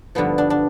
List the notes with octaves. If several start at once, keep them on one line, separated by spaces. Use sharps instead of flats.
G2 D3 F3 B3
D4
D4